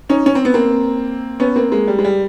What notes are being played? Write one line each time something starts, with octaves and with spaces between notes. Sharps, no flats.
C#4 D#4
C#4
C4
B3
A#3 C4
B3 C#4
A#3 C4
G#3 A#3
G3
G#3
G3